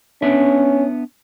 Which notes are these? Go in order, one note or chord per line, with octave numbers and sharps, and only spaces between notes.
B3 C#4 D4 E5